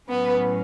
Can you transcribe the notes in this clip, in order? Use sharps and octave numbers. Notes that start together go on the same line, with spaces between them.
A2 F#3 B3 C#4 B4